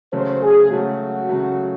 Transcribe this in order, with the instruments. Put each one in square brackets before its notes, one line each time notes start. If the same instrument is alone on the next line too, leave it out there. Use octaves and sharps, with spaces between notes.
[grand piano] C#3 F#3 A3 [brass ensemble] C5
[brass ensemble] G#4
[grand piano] C#3 F#3 A3 [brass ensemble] F#4
[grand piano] C#3 F#3 A3